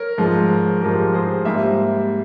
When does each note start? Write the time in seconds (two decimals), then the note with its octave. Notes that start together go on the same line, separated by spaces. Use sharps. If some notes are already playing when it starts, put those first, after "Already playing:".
Already playing: A#4 C#5
0.18 G#2 F3 G#3
0.82 G#2 F3 G#3 G4 A#4
1.14 G#4 C5
1.45 G#2 G3 A#3 C5 E5